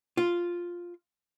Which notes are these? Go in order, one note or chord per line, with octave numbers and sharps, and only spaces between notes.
F4